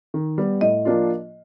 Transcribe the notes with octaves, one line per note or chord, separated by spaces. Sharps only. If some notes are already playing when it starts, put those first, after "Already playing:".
D#3
G3 B3
A2 D#5
F3 A#3 D4 F4